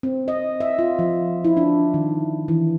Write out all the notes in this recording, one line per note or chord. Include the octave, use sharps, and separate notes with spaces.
C4
D#5
E5
F4
F3
E4
D4
D#3
E3